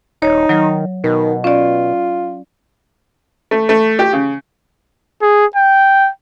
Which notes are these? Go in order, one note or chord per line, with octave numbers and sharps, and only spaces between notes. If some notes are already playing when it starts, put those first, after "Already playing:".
D#1 D#4 C#5
D#3 F#3
B2 D#3
C#4 F4 D5
A3
A3
G4
C#3
G#4
G5